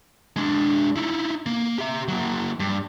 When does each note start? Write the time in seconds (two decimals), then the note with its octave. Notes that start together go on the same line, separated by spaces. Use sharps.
0.36 G#3 D4
0.96 D#4 E4
1.46 A#3
1.78 G4 E5
2.08 F#3 A#3
2.60 G2